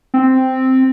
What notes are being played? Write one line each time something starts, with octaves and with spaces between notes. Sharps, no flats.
C4